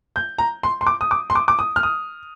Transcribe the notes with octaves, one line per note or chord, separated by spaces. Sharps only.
G6
A#5
C6
C6
D6
D#6
D6
C6
D6
D6
D#6
F6
D#6